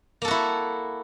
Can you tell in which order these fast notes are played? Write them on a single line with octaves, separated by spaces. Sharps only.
A#3 A4 F#4 E4